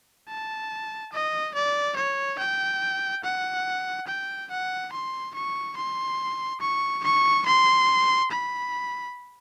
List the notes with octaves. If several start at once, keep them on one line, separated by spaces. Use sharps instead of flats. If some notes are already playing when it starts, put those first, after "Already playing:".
A5
D#5
D5
C#5
G5
F#5
G5
F#5
C6
C#6
C6
C#6
C#6
C6
B5